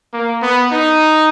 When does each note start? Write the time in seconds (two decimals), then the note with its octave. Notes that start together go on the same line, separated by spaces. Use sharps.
0.13 A#3
0.42 B3
0.72 D#4